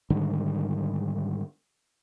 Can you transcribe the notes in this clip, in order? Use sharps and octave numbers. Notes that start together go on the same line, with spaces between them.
G#2 D3 D#3 G3